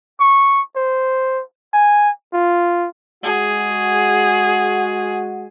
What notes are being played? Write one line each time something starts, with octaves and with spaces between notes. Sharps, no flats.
C#6
C5
G#5
F4
G#3 F#4 G#4